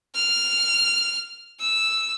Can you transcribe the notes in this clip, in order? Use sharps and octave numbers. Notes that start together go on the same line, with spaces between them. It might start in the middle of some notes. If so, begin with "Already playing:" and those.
F6
E6